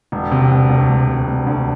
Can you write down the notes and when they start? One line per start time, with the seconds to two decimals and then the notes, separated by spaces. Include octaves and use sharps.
0.12 E1
0.31 C3
0.51 E1
0.70 D2
0.89 E1
1.07 C3
1.27 E1
1.47 D2